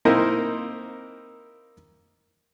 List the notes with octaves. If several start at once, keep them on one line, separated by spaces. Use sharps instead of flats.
A#3 C4 D#4 E4 A#4 C5